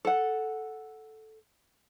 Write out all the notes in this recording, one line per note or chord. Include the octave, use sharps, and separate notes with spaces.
A4 F#5